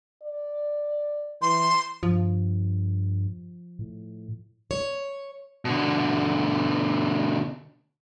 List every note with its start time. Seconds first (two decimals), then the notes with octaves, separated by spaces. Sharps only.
0.22 D5
1.41 E3 C6
2.03 G2 F3
3.79 A2
4.71 C#5
5.65 B2 D3